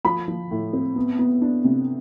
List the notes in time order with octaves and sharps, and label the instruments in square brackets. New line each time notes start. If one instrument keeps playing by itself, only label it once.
[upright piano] F3 B5
F3
A2
C4
B3
B3
D4
C3